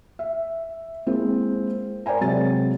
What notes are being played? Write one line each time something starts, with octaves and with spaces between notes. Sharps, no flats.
E5
G#3 A#3 C4 E4
A#4 C5 D5 G5 G#5 A#5
C3 F#3 G#3 C#5 A6